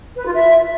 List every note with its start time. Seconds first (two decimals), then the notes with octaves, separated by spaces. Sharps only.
0.16 B4
0.25 F4
0.34 E5